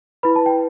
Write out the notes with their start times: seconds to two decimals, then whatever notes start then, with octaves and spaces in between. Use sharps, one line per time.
0.23 E4 B4 B5
0.36 A5
0.46 G5